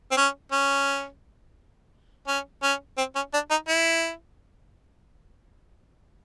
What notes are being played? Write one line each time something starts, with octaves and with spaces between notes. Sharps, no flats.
C4
C#4
C#4
C#4
C#4
C4
C#4
D4
D#4
E4